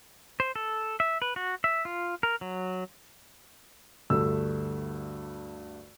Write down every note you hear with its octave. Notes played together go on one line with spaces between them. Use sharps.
C5
A4
E5
B4
F#4
E5
F4
A#4
F#3
D2 G2 A3 E6